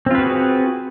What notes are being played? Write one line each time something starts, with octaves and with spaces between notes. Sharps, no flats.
C4 F4 F#4 G#4 B4